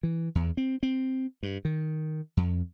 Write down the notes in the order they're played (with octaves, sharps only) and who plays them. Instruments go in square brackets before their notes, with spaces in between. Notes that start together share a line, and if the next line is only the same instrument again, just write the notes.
[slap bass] E3
E2
C4
C4
G2
D#3
F2